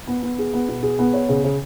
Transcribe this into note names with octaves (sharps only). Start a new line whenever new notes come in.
B3
B3
G#4
B3
B2
G#4
B3
C#5
C#3
C#3